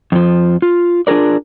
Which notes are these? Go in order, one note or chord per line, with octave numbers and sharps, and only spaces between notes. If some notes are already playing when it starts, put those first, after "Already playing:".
F2 F3
F4
D4 F4 G#4 A#4 D5